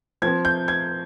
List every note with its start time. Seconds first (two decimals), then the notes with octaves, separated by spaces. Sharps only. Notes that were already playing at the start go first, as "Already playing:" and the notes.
0.22 F3 C4 G#6
0.45 G6
0.68 G#6